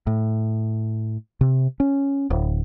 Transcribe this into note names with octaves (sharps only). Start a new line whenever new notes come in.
A2
C3
C#4
D1